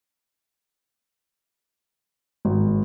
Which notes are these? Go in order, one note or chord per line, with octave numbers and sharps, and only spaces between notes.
G#1